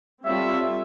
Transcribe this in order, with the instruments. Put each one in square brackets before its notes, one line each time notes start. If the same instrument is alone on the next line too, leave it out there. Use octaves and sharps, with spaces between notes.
[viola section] G3 C4 F4 A4 C#5 [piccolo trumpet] E5